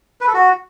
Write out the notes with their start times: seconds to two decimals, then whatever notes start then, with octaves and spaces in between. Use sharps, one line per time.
0.21 B4
0.27 A4
0.34 F#4